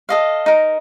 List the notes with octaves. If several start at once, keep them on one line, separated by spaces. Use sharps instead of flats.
A4 D#5 F5
D#4 A#4